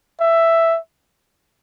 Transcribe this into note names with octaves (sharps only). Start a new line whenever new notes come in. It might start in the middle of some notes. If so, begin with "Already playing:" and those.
E5